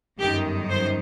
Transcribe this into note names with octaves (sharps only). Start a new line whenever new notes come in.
G1 F#2 D#3 G4
C5